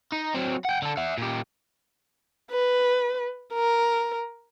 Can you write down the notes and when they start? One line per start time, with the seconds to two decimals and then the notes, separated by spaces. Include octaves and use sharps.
0.12 D#4
0.35 F#3 C4
0.65 F#5 G5
0.82 D3 A4
0.97 E5 F#5
1.18 A#2 G4
2.51 B4
3.53 A#4